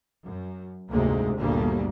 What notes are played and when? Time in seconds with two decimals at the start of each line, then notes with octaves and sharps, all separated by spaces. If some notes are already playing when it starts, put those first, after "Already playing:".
0.25 F#2
0.89 F1 D2 G#2 C3 G#3 A#3
1.36 G1 D2 A#2 G3 A#3